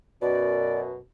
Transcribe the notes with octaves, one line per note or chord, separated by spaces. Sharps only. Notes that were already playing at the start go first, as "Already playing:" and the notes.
F#2 B2 D5